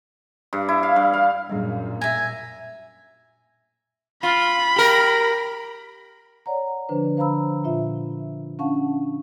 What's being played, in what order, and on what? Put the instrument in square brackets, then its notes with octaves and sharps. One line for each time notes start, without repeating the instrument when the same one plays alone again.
[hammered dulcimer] G2
E4
F5
G2
F5
[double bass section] F#2 A#2 [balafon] G3 D4 G#4
[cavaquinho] E5 A#5 [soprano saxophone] G#5
[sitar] F4 [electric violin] B5
[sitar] G4 A#4
[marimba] C#5 D5 F#5 A#5
D3 F3 D4 B4 C5
C5 F5 A#5 B5 E6
A#2 F4 E5
C#4 D4 F5 F#5 A5 C#6